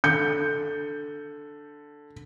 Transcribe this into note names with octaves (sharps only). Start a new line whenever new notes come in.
D3 G6 C#7